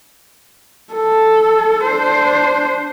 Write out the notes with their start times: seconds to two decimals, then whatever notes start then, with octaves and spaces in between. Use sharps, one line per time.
0.93 A4
1.85 D4 C5